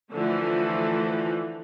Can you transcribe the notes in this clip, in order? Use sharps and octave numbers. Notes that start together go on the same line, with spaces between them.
D3 E3 F3 A3